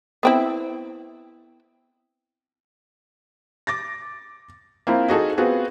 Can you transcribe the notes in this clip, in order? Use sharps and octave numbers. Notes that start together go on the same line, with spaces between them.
B3 C4 E4
D6 A6 A#6
A#3 C4 E4 F4
D#4 F#4 G#4 A4
B3 C4 F4 F#4 G#4